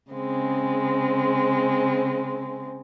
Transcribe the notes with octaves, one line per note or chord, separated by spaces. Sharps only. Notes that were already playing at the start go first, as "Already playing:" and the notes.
C#3 G#3 C4